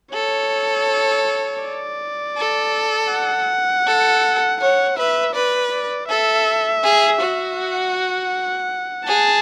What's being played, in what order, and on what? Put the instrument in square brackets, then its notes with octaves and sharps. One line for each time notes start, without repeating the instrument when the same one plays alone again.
[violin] A4 [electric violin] C#5
[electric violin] D5
[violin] A4
[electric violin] F#5
[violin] A4
[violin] C#5 [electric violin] F#5
[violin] B4 [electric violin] E5
[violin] B4 [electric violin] D5
[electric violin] D5
[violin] A4 [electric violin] E5
[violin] G#4
F#4
[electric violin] F#5
[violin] G#4 [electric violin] A5